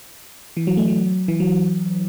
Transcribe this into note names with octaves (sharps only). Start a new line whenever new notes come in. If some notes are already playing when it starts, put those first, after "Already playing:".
E3
F#3
A3
F#3
E3
F#3